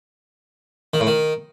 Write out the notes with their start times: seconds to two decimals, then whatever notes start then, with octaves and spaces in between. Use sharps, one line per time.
0.94 D#3
1.00 A2
1.07 D#3